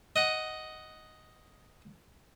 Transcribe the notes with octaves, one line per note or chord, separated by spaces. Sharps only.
D#5 F#5